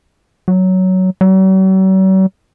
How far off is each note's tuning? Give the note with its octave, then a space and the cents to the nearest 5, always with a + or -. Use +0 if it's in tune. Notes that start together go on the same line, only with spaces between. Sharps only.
F#3 +10
F#3 +45